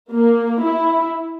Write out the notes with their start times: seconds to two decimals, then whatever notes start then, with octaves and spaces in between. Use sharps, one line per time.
0.13 A#3
0.62 E4